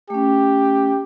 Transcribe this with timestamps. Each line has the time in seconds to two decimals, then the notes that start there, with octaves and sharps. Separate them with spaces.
0.10 A3 C#4 G4